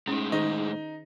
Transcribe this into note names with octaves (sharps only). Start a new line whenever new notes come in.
A2 G#3 C#4 D#4
D#3 D#4 G#4